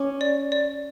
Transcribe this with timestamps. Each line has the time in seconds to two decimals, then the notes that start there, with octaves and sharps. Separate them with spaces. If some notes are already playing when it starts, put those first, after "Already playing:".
Already playing: C#4 D6
0.21 D5
0.52 D5